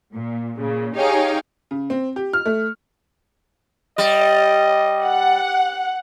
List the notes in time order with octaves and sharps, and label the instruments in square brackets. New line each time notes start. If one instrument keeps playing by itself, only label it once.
[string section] A#2
A#2 C#3
D#4 G4 G#4 C#5 F5 G5
[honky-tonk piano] C#3
C4
G4
F6
A3
[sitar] G3 [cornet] D#5
[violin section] F#5